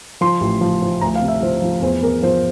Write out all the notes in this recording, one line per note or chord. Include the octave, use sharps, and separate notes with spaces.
F3 C6
A1
F3
F3
D2 A#5
F5
C3
E5
F3 C5
F3
E2 C5
E2 A#4
F3 C5